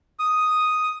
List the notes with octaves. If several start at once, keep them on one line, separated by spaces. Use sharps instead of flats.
D#6